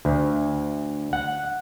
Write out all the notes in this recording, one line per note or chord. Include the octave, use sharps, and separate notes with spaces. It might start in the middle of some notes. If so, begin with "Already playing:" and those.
D2
F#5